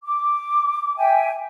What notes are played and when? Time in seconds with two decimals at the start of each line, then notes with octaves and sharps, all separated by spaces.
0.04 D6
0.97 E5 G5 G#5